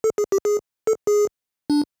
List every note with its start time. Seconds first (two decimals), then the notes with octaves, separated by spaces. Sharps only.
0.04 A4
0.18 G#4
0.32 G4
0.45 G#4
0.87 A4
1.07 G#4
1.70 D4